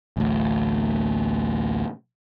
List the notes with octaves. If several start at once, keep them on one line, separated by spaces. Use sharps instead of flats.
A1 D2